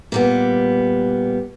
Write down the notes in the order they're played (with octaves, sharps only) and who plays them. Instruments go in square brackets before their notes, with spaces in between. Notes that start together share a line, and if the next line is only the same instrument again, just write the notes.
[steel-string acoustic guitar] A#2 G3 B3